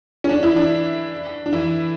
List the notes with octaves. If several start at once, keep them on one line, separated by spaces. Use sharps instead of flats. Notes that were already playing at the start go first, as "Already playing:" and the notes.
C#4
D4
E3 E4
D4
D4
E3 E4